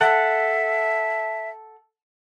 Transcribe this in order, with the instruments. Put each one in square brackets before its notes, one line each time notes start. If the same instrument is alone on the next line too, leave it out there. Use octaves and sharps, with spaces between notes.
[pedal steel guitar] A4 F#5 [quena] E5